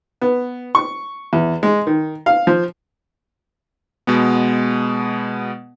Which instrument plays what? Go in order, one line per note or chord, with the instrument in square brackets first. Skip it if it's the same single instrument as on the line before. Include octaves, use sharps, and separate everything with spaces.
[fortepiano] B3
C#6
E2
G#3
D#3
F5
F3
[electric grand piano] B2 G#3 B3